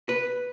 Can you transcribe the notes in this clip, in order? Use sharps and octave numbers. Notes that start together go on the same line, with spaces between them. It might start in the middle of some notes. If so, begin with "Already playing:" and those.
B4